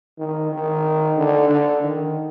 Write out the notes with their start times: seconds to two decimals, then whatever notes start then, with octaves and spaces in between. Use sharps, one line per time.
0.19 D#3
0.52 D#3
1.17 D3
1.49 D3
1.83 D#3